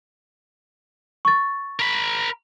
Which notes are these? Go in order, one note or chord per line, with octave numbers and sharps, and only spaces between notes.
C#6 A6
A#4 B5